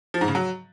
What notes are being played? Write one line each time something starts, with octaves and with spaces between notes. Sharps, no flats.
F3
G#2
C#3
F#3